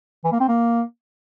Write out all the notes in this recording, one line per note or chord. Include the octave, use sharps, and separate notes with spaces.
E3
A#3
C4
A#3